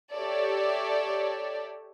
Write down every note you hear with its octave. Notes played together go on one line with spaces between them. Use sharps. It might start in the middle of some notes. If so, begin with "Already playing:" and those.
G4 A4 C#5 D5 E5